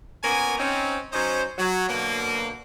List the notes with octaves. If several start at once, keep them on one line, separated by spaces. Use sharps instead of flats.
A#2 B3 C#4 A#4 G#5
C4 C#4 D#4
F#3 C#4 D#4 C5
F#3
B2 D3 F#3 A#3